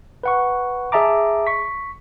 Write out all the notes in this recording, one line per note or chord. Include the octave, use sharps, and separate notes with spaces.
B4 F#5 C#6
G#4 D#5 E5 A5 A#5 D6
C#6 B6